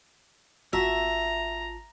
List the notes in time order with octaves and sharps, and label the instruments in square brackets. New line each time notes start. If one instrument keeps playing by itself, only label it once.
[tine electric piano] G#1 F4 A5 [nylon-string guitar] F#4 [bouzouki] E5 [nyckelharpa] A#5